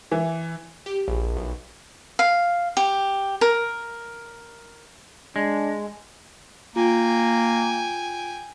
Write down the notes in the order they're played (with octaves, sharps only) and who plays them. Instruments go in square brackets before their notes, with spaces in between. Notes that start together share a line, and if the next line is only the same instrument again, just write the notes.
[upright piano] E3
[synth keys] G4
A#1
B1
[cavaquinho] F5
G4
A#4
[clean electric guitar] G#3 [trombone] D4
[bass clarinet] A#3 [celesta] F4 [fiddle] G5 G#5